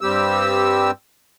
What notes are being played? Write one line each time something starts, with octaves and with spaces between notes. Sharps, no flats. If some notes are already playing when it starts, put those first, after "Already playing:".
G2 G3 C4 G4 E6